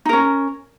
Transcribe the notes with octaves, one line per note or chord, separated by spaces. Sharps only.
C#4 D#4 A#4